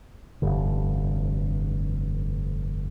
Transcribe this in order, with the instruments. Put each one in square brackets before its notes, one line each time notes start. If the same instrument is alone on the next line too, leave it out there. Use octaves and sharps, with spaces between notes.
[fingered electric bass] F1 B1 G2 D3